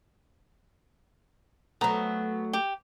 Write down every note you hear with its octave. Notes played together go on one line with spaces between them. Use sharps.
F#3 A3 B3 A#5
G4